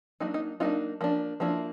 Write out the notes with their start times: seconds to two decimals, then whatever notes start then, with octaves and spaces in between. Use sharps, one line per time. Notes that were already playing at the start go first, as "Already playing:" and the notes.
0.20 F#3 A#3 D4 D#4
0.34 D#4
0.60 F#3 A#3 D4 D#4 F4
1.01 F3 A#3 D4
1.40 F3 A#3 D4 E4